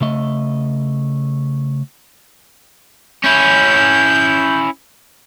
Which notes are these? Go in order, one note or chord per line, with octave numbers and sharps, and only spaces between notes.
C#3 A3 D#5
C#4 E4 G6